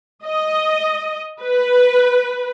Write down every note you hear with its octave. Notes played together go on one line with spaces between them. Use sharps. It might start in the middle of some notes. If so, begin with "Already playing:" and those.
D#5
B4